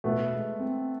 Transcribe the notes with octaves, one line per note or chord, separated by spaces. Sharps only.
B2 A3 B3
G#3
C4